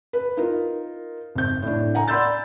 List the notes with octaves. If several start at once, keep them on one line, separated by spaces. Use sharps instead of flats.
B4
D#4 F4 A#4
G#1 G6
A2 D4
F#5 G#5 A#5
D5 B5 C6 E6 G6 A6